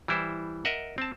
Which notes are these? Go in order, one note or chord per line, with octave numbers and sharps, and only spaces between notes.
E3 G3 E4 C5
A#4 D#5 E5 F#5
C4 A5